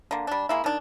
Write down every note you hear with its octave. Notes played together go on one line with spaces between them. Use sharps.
D3 A#3
G3 D4
G#3 A#3 E4
D#3 D4